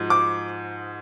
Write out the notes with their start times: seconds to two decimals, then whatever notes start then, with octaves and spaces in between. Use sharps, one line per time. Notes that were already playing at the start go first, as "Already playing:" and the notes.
Already playing: G#2 F3 G#3 F#4
0.10 D6